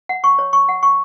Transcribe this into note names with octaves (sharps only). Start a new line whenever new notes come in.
F#5
C#6
C#5
C#6
F#5
C#6